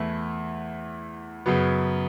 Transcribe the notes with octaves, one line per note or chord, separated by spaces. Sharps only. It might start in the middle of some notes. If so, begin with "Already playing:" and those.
Already playing: E2 E3 A3 E4
F#2 C#3 F#3 B3